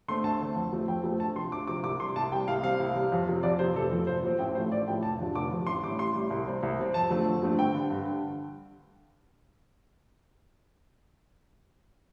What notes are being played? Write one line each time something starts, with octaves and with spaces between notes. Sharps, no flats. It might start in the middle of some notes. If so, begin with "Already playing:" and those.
D3 A3 C4 C6
D2 A5
D3 A3 C4
F2
F3 A3 C4
F2 G5
F3 A3 C4
D2 A5
C3 F3 C6
D2 D6
C3 F3 D6
C2 D6
C3 G3 C6
C2 A5
C3 G3 G5
C2 F5
C3 G3 C4 F5
C2
C3 G3 C4
F2
C3 F3 C4
F2 D5
C3 F3 C4 C5
F1 A4
F2 F3 C4
F1 C5
F2 F3 C4
A1 G5
A2 F3 A3 C5
A1 D5
A2 F3 A3 G5
F1 A5
F2 D3 F3
F1 D6
F2 D3 F3
A1 C6
A2 G3 D6
A1 C6
A2 G3
C2
C3 G3 C4
C2
C3 G3 C4
F2 A5
D3 F3 A3 C4
F2
D3 F3 A3 C4
G2 G5
D3 G3
G2
D3